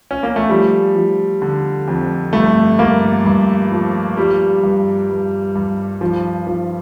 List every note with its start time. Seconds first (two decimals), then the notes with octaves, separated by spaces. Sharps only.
0.11 C#4
0.23 A#3
0.36 A3
0.49 F3 G3
0.95 F3
1.42 D3
1.88 F2
2.33 G2 A3
2.79 G2 A#3
3.25 G2
3.71 F3
4.17 F3 G3
4.63 G2
5.09 G2
5.55 G2
6.01 F3
6.47 F3